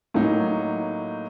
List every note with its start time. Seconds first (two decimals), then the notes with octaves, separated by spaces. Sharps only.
0.14 A2 F#3 A#3 D#4